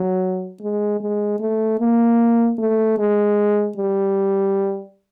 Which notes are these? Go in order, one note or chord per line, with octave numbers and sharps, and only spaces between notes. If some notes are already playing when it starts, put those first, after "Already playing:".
Already playing: F#3
G#3
G#3
A3
A#3
A3
G#3
G3